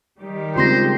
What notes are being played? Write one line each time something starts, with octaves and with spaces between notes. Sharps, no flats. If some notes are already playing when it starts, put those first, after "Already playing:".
D#3 G3 G4
C#3 G#3 C4 F4 C5 C6 A#6